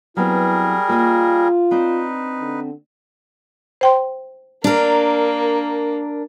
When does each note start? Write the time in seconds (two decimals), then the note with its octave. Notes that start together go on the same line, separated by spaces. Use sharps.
0.17 F#3 G3 B3 C4 E4 G#4 A#4
0.89 A#3 F4 D#5
1.71 C4 D4 D#4 B4
2.40 D3
3.81 C5 G5 C6
4.64 A#3 D4 A#4